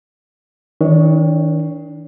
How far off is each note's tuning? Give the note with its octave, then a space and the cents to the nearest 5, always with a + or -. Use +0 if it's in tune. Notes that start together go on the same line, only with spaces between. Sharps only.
D#3 +35 D4 -20 C#5 +0